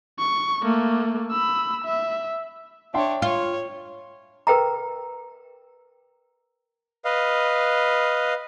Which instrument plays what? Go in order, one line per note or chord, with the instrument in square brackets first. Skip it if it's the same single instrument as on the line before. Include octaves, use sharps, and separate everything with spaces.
[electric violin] C#6
A3 A#3
B5 E6
E5
[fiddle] D4 C#5 [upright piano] E5 G5 C6
[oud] F4 [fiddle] C#5
[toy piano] A#4 B4 G5 A#5
[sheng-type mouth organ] B4 D#5 F5